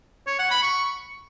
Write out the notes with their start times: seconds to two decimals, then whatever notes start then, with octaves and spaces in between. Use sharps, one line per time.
0.27 C#5
0.39 F#5
0.51 B5
0.63 C#6